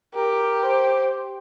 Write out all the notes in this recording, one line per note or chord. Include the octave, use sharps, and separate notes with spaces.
G4 A#4
C5